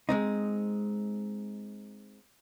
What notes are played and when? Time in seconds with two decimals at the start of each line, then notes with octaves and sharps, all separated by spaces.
0.09 G#3 C4 D#4